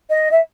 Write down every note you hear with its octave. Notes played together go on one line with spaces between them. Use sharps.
D#5
E5